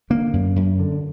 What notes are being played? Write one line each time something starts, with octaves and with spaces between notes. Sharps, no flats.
D3 A#3
F#2
F#2
D3